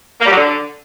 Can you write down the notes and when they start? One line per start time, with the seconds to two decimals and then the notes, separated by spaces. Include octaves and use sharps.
0.20 A#3
0.26 G3
0.31 F#3
0.37 D3